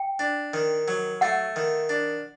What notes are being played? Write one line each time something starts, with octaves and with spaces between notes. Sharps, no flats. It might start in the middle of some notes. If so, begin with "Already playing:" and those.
Already playing: G5
D4
D#3
F#3
A3 F#5
D#3
D4